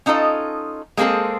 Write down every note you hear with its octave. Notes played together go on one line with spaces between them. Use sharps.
C#4 D#4 F4 A4 D#5
G#3 A#3 C4 G#4 A4